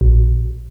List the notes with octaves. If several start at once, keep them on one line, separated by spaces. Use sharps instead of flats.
A#1